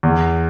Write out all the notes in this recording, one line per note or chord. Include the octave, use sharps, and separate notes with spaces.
E2